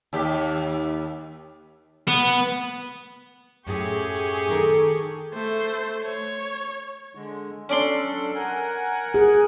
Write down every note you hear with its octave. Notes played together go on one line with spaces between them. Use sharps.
D#2 G4
B3
F#2 A2 G4 G#4 C#6
D#3 A4 A#4
A3 C5
C#5
D3 G#3
F#3 C#4 D4 A4 D5 C6
A#4 F#5 G#5
G#4